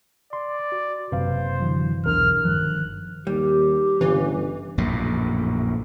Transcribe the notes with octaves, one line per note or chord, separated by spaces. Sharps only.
D5 C6
F#4
F#1 C3 B4 C5 F5
D3 E3 F#3
B1 E2 D4 A#4 F6
G1 D#3 F3 F#6
D#2 G3 G4
G1 C2 G2 C#3 E3
A#1 F#2 A2